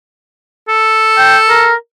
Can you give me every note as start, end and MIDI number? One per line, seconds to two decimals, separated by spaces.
0.69 1.72 69
1.18 1.37 79
1.49 1.74 70